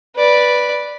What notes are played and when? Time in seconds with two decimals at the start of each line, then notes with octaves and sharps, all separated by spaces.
0.16 B4 D5